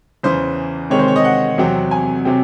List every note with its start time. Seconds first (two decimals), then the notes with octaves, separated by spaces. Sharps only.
0.23 E2 C#3 E3 C5
0.90 C3 D#3 G#3 C4 C#5
0.99 C5
1.08 C#5
1.16 D#5
1.25 F#5
1.58 E2 C3 F#3 C4
1.91 G#5
2.25 C3 F#3 C4